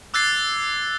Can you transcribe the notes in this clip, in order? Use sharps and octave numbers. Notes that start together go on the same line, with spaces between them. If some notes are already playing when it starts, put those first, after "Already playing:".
D6 E6 F#6 G#6 A6 C7